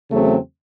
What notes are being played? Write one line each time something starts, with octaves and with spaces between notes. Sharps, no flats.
E2 C#3 F#3 A3 C4